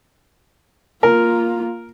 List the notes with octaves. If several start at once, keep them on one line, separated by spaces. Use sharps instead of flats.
A#3 F4 A#4